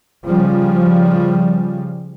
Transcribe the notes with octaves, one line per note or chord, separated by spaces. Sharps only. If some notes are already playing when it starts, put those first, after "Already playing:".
C#3 F3 G3